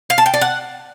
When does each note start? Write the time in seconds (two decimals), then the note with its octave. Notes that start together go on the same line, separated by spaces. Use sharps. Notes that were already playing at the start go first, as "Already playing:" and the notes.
0.10 F5
0.18 A5
0.26 G5
0.34 D5
0.41 F#5